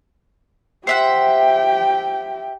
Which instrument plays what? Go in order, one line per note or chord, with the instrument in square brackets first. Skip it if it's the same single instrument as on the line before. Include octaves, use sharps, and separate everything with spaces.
[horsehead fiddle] G4 G5 [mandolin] C5 E5 F#5